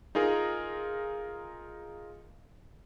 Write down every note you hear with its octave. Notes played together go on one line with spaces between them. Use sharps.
D#4 F4 G#4 A#4